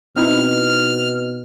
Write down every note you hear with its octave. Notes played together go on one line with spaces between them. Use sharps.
B2 C4 D#4 E4 F6